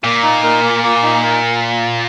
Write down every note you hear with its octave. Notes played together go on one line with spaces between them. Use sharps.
A#2 A#3
D#4
A#4
A#3
A#3
D#4
A#4